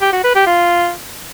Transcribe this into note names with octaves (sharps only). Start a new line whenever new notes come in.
G4
F#4
B4
G4
F4